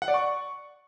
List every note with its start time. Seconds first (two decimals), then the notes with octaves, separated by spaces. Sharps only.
0.02 F#5
0.08 D5
0.14 C#6